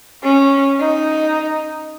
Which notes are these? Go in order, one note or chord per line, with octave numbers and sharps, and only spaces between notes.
C#4
D#4